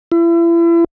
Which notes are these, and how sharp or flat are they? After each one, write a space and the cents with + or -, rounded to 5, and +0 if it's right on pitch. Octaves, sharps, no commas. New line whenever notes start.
E4 +35